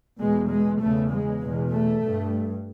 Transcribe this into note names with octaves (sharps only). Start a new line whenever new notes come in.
E2 B2 G#3
G#3
E2 C#3 A3
G#3
E2 B2
A3
G2